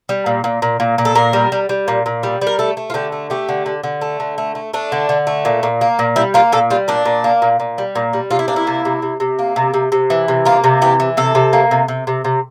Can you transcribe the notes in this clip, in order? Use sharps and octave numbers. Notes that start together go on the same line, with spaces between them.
G3
A#2
A#2
A#2
A#2
A#2
A4
A#2 A#4
G3
G3
G3
A#2
A#2
G3
G3
A#4
A3 A4
A3
F4
D3 G4
A3
A3 G4
D3
D3
D3
A3
D3
A3
A3
A3 D4
D3
D3
A3
A#2
A#2
A#3
A#2
G3 E4
A#3 F4
A#2 A4
G3 F4
A#2 D4
A#2
A#3
A#2
A#2
G3
A#2
G3
C3 F4
E4
A#3 D4
E4
C3
C3
C3
C3
A#3
C3
C3
C3
E3
C3
A#3 F4
C3
E3 G4
E3
C3 A4
C3
A#3
C3
C3
C3
C3